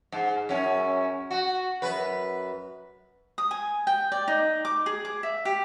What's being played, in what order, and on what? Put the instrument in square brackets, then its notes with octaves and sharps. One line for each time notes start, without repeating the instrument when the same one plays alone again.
[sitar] G#2
F#2 C#4
F#4
F#2 B4
[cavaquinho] D#6
G#5
G5
D5
D#4
D6
G#4
D6
E5
G4